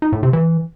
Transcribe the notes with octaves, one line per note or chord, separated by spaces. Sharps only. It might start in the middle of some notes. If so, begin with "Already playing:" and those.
D#4
A2
C3
E3